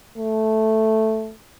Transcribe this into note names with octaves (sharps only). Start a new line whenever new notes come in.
A3